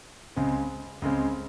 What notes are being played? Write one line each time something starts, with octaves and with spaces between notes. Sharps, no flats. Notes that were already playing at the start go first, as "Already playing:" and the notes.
C#2 C#3 G#3 C4
C#2 C#3 G#3 C4